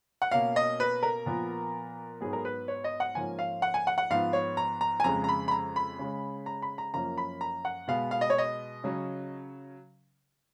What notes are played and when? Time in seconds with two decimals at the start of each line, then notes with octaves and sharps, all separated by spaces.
0.22 F#5
0.31 B2 A#3 C#4 F5
0.56 D#5
0.80 B4
1.03 A#4
1.26 A#2 F3 B3
2.21 G#2 F#3 B3 G#4
2.33 A#4
2.45 B4
2.68 C#5
2.84 D#5
3.00 F#5
3.15 G#2 F3 A#3 C#4 G#5
3.39 F5
3.62 F#5
3.74 G#5
3.87 F#5
3.98 F#5
4.10 G#2 F3 B3 F5
4.33 C#5
4.57 A#5
4.81 A#5
5.00 G#5
5.04 F2 C#3 G#3 A#5
5.24 A#5
5.29 B5
5.48 B5
5.51 A#5
5.76 B5
5.99 C#3 G#3 C#4
6.46 A#5
6.62 B5
6.78 A#5
6.94 F#2 F3 A#3 C#4 A#5
7.18 B5
7.41 A#5
7.65 F#5
7.88 B2 G#3 B3 F5
8.11 F5
8.21 D#5
8.30 C#5
8.38 D#5
8.84 C#3 F#3 C#4